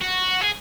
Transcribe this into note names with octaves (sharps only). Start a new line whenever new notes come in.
F#4
G#4